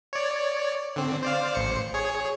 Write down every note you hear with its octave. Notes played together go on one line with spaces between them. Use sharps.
C#5 D5
D3 C4
C5 D5 F5
A1 C5 C#7
G#4 C#5